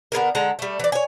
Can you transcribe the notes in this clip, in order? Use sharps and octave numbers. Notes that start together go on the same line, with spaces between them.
D3 B3 G#4 A#4
D3 G#3 A4 A#5
G3 A3
E3 D5
C#5 G#5